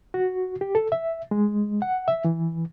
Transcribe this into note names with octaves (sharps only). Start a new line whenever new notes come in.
F#4
G4
A4
E5
G#3
F#5
E5
E3